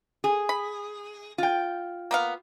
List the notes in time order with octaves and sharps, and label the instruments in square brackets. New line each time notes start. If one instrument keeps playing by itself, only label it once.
[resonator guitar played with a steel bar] G#4
[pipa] B5
[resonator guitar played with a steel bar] F4 G5
[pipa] A#3 B3 F5